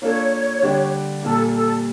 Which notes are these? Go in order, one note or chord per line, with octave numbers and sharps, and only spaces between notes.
A#3 D4 F4 A4 C#5
D3 G3 D4 G4 D5
A#2 G3 A#3 A4
A4